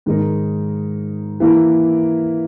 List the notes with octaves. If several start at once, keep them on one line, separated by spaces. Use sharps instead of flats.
G#2 D#3 G#3 D#4 A#4
E3 A#3 E4 A#4